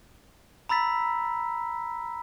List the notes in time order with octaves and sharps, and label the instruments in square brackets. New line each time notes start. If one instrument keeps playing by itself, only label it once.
[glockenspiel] A#5 B5 E6 A6 B6